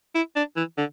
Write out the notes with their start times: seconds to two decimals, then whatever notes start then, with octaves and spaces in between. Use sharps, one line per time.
0.15 E4
0.36 D4
0.56 E3
0.78 D3